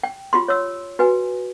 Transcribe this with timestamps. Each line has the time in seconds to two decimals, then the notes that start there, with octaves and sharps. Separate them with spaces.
0.03 G5
0.33 F4 G4 C6
0.48 C#5 E6
0.99 F#4 B4 G#5